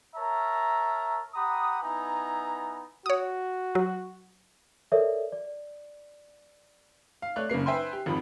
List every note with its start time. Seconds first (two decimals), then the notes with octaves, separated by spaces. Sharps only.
0.16 A#4 C#5 E5 A5 A#5
1.34 G4 F#5 A#5 B5 D#6
1.82 B3 D#4 E4 B4 G#5 A#5
3.06 F#4 C#5 D#6
3.75 F#3
4.92 A4 A#4 C#5 D5 E5
5.32 D5
7.22 F5
7.36 A3 C#5 D5 F#6
7.50 F#1 C#3 A#3 C7
7.66 B4 C5 E5 G5 G#5 C6
7.93 G4
8.06 G#1 F2 F3 B5